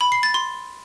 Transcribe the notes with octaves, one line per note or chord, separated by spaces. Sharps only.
B5
C7
A6
C6